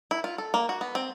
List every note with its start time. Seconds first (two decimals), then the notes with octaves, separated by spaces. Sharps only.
0.11 E4
0.24 F4
0.38 A4
0.54 A#3
0.69 F#4
0.81 B3
0.95 C4